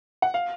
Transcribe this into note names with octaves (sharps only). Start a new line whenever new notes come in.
F#5
F5